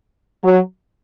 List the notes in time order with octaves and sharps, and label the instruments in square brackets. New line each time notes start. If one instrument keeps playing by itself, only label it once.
[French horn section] F#3